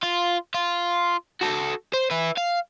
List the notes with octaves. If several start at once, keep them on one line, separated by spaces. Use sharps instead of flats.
F4
F4
F#4 A4
C5
E4 B4
F5